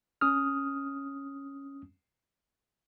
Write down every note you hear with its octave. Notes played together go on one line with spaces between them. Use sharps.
C#4 D#6 F6